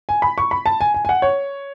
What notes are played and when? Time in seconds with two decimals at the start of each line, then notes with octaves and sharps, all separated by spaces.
0.09 G#5
0.22 B5
0.38 C#6
0.51 B5
0.66 A5
0.81 G#5
0.94 G#5
1.05 G#5
1.09 F#5
1.22 C#5